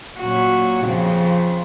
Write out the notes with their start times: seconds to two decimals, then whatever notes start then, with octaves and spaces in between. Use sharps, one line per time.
0.19 A#2 F#3 C#4 F#4
0.85 F2 C#3 F3 C4